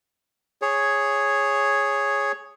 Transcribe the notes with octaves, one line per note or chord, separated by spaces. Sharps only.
G#4 C#5